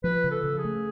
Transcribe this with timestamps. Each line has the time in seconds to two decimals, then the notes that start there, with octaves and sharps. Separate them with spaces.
0.04 F3 B4
0.24 C#3
0.31 A4
0.44 C#3
0.58 G#4
0.65 A3